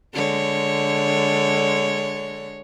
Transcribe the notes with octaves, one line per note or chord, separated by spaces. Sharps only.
D3 G#3 C#5